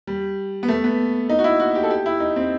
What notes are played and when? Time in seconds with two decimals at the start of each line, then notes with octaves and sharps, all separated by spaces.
0.07 G3
0.63 B3
0.68 A3
0.84 B3
1.29 D#4
1.39 F#4
1.44 E4
1.60 F#4
1.75 G4
1.83 A4
1.91 G4
2.06 E4
2.20 D#4
2.36 C4